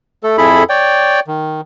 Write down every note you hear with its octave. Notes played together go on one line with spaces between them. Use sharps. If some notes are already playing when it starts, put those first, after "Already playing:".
A3 A4
F2 E4 G#4 A4 B5
C#5 D5 G5
D#3